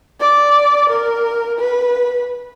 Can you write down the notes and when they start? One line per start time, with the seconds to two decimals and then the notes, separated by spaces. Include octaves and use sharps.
0.20 D5
0.89 A#4
1.59 B4